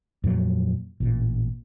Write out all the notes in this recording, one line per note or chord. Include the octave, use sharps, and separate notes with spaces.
F2 A#2 F#3
A1 A#2